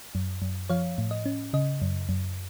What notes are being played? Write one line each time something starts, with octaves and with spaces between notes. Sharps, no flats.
F#2
F#2
F3 C#5 F5
A2
D#5
C#4
C#3 D#5
F#2
F#2